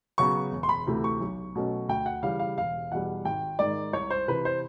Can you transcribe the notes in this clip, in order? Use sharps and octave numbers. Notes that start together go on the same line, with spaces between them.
C#3 F#3 B3 C#6
E1
C6
B5
D2 C3 E3 A3
C#6
B1
B2 F#3 A3 C#4
D2 G5
F#5
C#3 E3 G3 F5
F5
E1 F5
E2 B2 G3 F#5
G#1 G5
G#2 D#3 D5
C2 C#5
C5
C3 E3 B4
C5